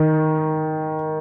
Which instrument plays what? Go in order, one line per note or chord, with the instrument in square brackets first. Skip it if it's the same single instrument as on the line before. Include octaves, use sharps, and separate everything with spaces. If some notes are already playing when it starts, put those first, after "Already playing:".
Already playing: [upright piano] D#3